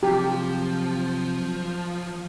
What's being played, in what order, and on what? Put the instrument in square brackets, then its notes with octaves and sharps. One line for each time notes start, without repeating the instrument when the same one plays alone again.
[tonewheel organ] C3 F#3 C4 [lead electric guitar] F3 [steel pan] G4